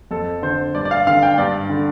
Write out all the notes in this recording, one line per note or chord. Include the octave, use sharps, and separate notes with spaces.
F2 A4
D3 C5
G2 D5
D5
F5
D3 F5
G5
G2 D5
D3